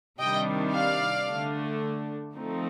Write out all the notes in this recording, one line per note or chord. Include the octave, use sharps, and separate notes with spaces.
C3 D#3 G3 D4 D#5 G5
D5 F5
D3 A3 D4
F3 A3 C4 D#4